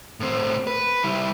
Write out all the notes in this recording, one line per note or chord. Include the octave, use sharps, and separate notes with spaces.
A2 C4
B4
G3 E4